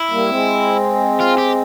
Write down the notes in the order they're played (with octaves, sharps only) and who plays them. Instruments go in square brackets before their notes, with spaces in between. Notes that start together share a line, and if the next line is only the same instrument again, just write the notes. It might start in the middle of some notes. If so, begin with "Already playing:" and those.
Already playing: [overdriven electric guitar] E4
[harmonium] G3 A#3
G#3 C4
[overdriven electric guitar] F4
G4